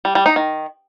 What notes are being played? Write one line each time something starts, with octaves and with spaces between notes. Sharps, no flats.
G3
G3
D#4
D#3